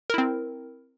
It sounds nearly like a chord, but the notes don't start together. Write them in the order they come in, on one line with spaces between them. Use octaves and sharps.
A#4 E4 C4